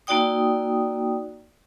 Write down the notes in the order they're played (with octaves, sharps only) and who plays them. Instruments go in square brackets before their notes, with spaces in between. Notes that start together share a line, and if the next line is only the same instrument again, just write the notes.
[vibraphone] A#3 D#4 F#4 D5 G5 D#6